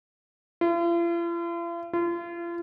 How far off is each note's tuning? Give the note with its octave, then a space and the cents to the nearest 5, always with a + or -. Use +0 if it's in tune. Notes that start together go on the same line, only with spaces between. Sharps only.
F4 -45
F4 -35